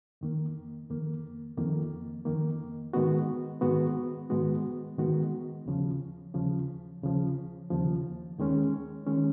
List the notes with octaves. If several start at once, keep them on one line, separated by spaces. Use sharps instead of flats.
F2 D#3 A#3
F2 D#3 A#3
F2 D#3 A#3
F2 D#3 A#3
G#2 D#3 G#3 B3 F#4
G#2 D#3 G#3 B3 F#4
G#2 D#3 G#3 B3 F#4
G#2 D#3 G#3 B3 F#4
D#2 C#3 F3
D#2 C#3 F3
D#2 C#3 F3
D#2 C#3 F3
D#2 D#3 G#3 C#4
D#3 G#3 C#4